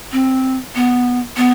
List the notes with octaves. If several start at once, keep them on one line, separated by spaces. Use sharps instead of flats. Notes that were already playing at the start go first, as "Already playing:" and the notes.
C4
B3
B3